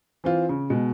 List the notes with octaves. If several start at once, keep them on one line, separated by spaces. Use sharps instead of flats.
E3 C4 F4
C#3
B2 G#3